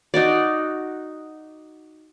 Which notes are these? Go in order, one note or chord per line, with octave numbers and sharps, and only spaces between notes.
D#4 F#4 D5